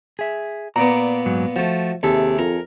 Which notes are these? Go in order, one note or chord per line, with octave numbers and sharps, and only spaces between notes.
G#4 E5
A#2 A#3 B3 D5 A#5
G#2 F#3
F3 A3 F#4
D#2 C3 G#4 A4 E5
F2 A#4